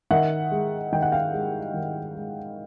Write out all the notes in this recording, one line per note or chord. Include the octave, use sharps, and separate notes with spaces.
D#3 E5 F#5
G#3
D#3 G5
F#5
F5 G5
G#3
D#3
G#3